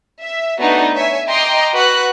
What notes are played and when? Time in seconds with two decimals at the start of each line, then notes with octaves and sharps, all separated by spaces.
0.22 E5
0.59 A3 B3 D4 D#4 F#4
0.94 C#5 E5 G#5
1.28 D#5 G5 A#5 C6 D6
1.73 F#4 B4 F#6